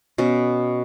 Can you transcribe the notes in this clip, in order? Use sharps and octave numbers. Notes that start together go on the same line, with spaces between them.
B2 C#4